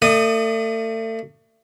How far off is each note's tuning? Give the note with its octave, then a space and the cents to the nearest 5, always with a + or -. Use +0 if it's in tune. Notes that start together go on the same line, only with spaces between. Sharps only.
A3 +35 D5 +45 D#6 +0